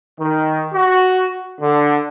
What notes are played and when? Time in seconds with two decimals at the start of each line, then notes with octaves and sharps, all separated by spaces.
0.19 D#3
0.73 F#4
1.59 D3